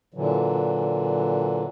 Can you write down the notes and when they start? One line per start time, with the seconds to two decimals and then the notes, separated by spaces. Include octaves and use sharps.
0.14 A#2 D3 E3 F#3